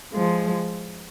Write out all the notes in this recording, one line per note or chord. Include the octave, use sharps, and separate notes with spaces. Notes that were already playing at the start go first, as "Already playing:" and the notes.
F3 G#3